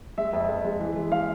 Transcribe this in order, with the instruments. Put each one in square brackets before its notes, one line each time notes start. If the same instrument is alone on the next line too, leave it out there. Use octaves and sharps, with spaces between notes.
[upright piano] G#3 E5
F2
F2
G#3
E3
G#3
G#3 F5